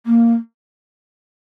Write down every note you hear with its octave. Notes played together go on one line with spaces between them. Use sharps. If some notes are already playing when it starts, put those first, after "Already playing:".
A#3